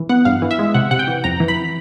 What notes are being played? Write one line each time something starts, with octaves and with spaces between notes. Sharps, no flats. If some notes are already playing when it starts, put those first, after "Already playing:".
Already playing: E3
B3 F#5
G2 F5
E3
E5
G#3
C3 F#5
C3 F#5
G5
E3
F2 A#5
E3
B5